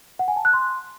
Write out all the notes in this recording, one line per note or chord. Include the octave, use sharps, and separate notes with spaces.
F#5
G#5
A5
F#6
C6